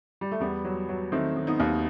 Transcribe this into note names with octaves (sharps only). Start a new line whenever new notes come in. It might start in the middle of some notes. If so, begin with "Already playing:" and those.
G3
A3
E2 G3 B3
F#3
F#3
D#3 A3 C4
D#3
B3 D#4
D#2